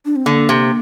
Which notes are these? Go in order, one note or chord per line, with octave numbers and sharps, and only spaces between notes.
D4
C4
D3 A#3
C3